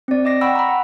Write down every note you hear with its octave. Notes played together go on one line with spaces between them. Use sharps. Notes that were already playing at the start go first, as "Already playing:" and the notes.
C4 D5
D#5 D6 A#6 C7
F#5 G5 B5 C#6 E6
A#5 B5
F#5